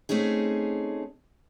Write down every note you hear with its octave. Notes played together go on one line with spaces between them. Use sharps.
A3 C4 C#4 D#4 G#4